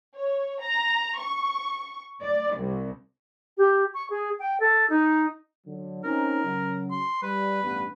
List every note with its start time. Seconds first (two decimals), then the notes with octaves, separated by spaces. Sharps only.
0.16 C#5
0.62 A#5
1.18 C#6
2.22 D5
2.59 C2
3.58 G4
3.94 C#6
4.10 G#4
4.39 G5
4.60 A4
4.90 D#4
5.66 D3 F#3
6.04 C4 C#4 D#4 A#4
6.43 C#3 F#3
6.91 C6
7.23 G3 B4
7.63 A1 G2 B3